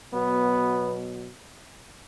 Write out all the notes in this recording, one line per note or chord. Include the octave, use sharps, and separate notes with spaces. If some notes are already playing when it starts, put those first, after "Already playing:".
B2 F#3 B3